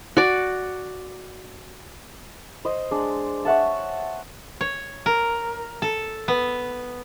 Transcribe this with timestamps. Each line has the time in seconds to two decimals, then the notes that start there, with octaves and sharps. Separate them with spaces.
0.17 F#4 D5
2.65 C5 D#5
2.91 G#3 D4
3.45 C#5 E5 F#5 A5
4.61 C#5
5.06 A#4
5.82 A4
6.28 B3